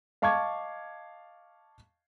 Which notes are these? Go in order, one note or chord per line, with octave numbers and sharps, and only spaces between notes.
D#5 F5 A5 C#6 D6 G#6